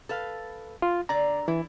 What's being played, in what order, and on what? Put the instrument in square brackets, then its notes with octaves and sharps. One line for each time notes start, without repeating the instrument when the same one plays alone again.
[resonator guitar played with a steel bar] A4 B4 F5
[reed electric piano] F4
[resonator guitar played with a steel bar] D3 D5 [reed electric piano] A#5
[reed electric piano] E3 [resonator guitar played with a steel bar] E4